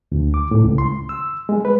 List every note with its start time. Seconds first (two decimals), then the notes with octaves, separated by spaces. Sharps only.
0.12 D2
0.34 D6
0.51 A2
0.64 C#2
0.78 C6
1.09 E6
1.49 G#3
1.65 B4